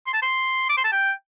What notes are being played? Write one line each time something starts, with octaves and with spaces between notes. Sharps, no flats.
C6
A5
C6
D6
C6
A5
G5